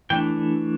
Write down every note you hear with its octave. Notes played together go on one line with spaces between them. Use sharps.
E3 A3 D4 G5